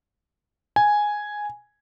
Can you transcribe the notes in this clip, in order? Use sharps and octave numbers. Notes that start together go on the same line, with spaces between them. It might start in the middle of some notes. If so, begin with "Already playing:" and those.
G#5